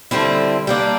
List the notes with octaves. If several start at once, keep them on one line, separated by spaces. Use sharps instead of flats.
D3 G3 C4 E4
G3 A#3 D4